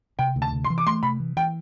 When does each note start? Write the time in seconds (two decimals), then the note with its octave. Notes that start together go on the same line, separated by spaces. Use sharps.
0.19 C3 G5
0.36 D2
0.42 A5
0.53 C3
0.64 C6
0.70 E3
0.78 D6
0.87 A3 C6
1.03 C3 B5
1.20 E3
1.36 E3 G5